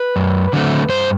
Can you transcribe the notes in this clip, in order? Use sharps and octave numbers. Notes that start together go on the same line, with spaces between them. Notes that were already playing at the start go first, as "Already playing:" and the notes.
Already playing: B4
F#2
D3 F#3 A3 C4
G2 C5